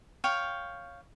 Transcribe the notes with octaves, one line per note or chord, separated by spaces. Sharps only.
C#5 F5 G5